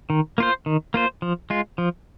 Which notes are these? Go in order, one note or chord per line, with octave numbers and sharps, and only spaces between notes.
D#3
A#3 F4 C5
D#3
A#3 F4 C5
F3
G#3 F4
F3